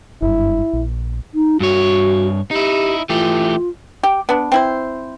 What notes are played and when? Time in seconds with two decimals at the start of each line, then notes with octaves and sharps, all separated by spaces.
0.22 F#1 G2 E4
0.73 A#1
1.34 D#4
1.60 G2 F#4 C#5
2.51 D#4 E4 G4
3.09 E3 A3 F4 G4
4.03 G4
4.29 B3 D4
4.52 C4 E4 C5